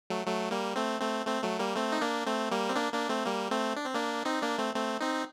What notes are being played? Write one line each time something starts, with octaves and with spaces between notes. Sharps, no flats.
F#3 A3
F#3 A3
G3 A#3
A3 C4
A3 C4
A3 C4
F#3 A3
G3 A#3
A3 C4
D#4
A#3 D4
A3 C4
G3 A#3
C4
A#3 D4
A#3 D4
A3 C4
G3 A#3
A3 C4
D4
C4
A#3 D4
C4 D#4
A#3 D4
A3 C4
A3 C4
C4 D#4